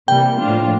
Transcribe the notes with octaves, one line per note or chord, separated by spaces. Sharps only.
C3 E3 G3 A#3 G5
A2 F3 A#3 D4 F4